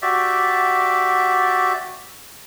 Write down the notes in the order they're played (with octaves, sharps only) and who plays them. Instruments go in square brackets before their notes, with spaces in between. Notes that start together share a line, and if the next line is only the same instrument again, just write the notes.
[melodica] F#4 G4 D5 E5